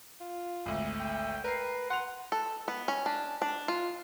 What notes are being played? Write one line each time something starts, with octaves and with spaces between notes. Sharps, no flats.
F4
G#1 D2
G5
A#4 B4 C7
F#5 C6 F7
A4
B3
C#4
D4
D4
F4